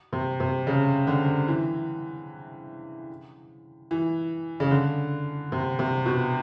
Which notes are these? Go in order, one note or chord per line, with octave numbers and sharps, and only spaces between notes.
C3
C3
C#3
D3
E3
E3
C#3
D3
C3
C3
B2